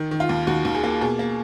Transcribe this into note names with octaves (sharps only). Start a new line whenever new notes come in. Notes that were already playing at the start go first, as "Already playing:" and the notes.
Already playing: D#3
D#3
F4
D#2
D#2 F#4
D#2
G#4
A#3
B2 G#4
A#3